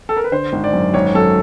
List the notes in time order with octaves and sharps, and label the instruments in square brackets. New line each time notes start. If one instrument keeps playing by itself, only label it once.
[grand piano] A4
A#4
B4
D3 C5
G#1
D5
F#2
G#1 C#5
F#2 A4